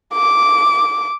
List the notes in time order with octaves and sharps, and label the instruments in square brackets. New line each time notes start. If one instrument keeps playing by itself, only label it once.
[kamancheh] D6